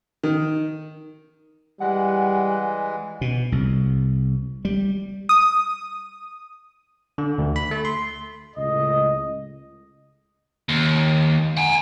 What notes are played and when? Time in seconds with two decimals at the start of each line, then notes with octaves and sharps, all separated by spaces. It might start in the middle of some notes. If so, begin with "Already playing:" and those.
0.23 D#3
1.80 E3 G3 G#3 F#5
3.21 B2
3.52 C2
4.65 G3
5.29 D#6
7.18 D3
7.38 D2
7.56 B5
7.71 A3
7.85 C6
8.56 C#2 A2 D#5
10.69 D#2
11.57 F#5 G#5